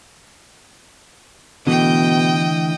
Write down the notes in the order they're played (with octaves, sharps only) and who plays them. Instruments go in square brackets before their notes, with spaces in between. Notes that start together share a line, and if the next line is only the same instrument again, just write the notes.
[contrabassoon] B2 [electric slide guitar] D3 E3 A3 [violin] D#5 G5